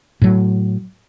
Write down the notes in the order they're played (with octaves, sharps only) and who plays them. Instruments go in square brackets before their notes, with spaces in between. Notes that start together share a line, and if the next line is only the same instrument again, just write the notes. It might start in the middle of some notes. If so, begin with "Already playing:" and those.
[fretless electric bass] A2 F#3